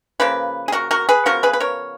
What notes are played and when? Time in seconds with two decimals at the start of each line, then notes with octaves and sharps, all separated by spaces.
0.20 C#3 F3 A#3 B4
0.68 G#4
0.72 F#4 A#4
0.91 F#4 A#4
1.09 G#4 B4
1.26 C#3 F3 B3 F#4 A#4
1.43 G#4 B4
1.53 B4
1.60 A#4 C#5